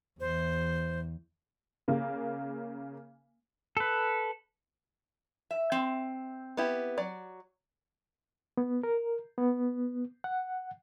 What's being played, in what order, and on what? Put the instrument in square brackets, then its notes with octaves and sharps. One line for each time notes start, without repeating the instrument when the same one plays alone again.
[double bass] E2 E3 [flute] C5
[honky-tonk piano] C#3 A#3
[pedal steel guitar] A4 B4
[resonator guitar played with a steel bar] E5
C4
[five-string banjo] B3 E4 G4
F#3 D5
[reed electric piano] B3
A#4
B3
F#5